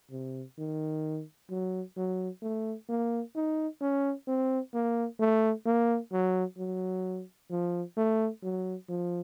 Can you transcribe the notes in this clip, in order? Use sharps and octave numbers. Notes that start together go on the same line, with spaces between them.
C3
D#3
F#3
F#3
A3
A#3
D#4
C#4
C4
A#3
A3
A#3
F#3
F#3
F3
A3
F#3
F3